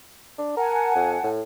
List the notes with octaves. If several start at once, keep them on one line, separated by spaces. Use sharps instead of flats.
D4
A#4 F#5 G#5 A5
F2
A2